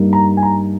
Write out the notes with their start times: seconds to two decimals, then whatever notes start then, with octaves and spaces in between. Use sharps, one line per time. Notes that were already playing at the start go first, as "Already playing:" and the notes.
Already playing: G2 G3 A#3 D#4
0.13 A#5
0.37 G#5
0.43 A#5